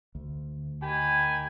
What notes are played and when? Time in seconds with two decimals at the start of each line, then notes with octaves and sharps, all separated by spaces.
0.15 D2
0.83 D#3 G4 G#5 B5